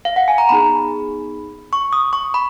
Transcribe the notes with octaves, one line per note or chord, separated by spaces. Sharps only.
F5
F#5
G#5
A#5
B3 D#4 G#4 B5
C#6
D#6
C#6
B5